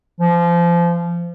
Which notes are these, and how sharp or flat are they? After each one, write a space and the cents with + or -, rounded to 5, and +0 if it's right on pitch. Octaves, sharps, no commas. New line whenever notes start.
F3 -25